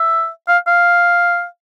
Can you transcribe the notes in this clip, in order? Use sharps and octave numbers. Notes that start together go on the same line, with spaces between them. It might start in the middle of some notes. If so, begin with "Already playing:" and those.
Already playing: E5
F5
F5